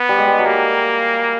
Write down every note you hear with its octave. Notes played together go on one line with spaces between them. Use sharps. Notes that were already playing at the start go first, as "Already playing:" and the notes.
Already playing: B3
G3
G#3
G3
F#3
G3 A#3